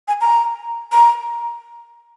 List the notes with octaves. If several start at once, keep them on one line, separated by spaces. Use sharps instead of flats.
G#5
A#5
A#5